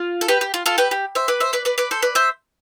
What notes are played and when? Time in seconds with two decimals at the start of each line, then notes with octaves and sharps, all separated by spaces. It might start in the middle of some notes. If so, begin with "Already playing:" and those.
Already playing: F4
0.21 A4
0.28 G4 B4
0.41 G4
0.54 F4
0.66 F4 A4
0.78 G4 B4
0.91 G4
1.15 C5 E5
1.28 B4 D5
1.40 C5 E5
1.53 B4 D5
1.65 B4 D5
1.78 B4 D5
1.91 A4 C5
2.02 B4 D5
2.15 C5 E5